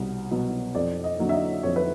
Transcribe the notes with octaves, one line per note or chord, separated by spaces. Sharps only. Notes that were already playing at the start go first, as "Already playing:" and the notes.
Already playing: C2 B2 B3
B2 F#3 B3
F2 D5
D#5
D3 F#3 A#3
E5
D#5
F2 C#5
B4